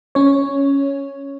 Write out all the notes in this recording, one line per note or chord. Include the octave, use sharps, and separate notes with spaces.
C#4 C#5